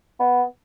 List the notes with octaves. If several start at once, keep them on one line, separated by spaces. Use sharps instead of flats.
B3